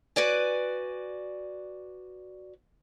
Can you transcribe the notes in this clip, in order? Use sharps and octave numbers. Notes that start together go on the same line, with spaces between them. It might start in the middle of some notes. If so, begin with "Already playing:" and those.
F#4 B4 D5 G#5